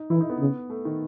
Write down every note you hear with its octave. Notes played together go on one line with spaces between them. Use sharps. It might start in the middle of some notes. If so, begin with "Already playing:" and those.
Already playing: D#4
E3 E4
D#4
B3
C#3
A3
D#3